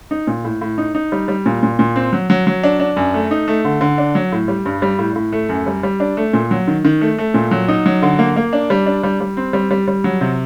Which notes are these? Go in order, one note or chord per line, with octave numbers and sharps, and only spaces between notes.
D#4
A#2
A2
A2
D#4
D#4
G3
G3
A#2
A#2
A#2
C4
F#3
F#3
F#3
D4
D4
F#2
A3
D#4
A3
D3
D3
D4
F#3
A2
G3
G2
G3
A2
A2
A3
F#2
G3
G3
D4
A3
A#2
F#3
D#3
D#3
A3
A3
A#2
F#3
D#4
F#3
D3
A#3
A#3
D4
G3
D4
G3
G3
C4
G3
G3
G3
F#3
C3